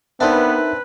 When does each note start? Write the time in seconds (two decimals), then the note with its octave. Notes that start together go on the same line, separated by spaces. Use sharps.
0.21 B3 C4 D4 D#4 A#4 B4 E5